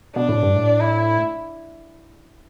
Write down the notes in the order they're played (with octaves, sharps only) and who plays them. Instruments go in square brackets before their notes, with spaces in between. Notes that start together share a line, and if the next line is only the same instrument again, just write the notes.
[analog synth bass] B2 [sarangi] D4
[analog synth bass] A2
G2
A2
[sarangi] E4